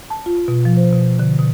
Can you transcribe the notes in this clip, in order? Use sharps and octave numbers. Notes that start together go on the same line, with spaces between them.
A5
F4
B2
F3
C5
B2
D3
B2